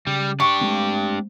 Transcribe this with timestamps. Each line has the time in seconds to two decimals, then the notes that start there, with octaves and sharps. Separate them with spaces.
0.07 C#3 G3
0.40 D4 G4 C#6
0.61 G#3 A3 C4